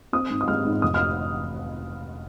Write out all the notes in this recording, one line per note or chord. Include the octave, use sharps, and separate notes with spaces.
C4 D#6
G#2
D#6
G#3 F6
G#2
F1 D#6
F6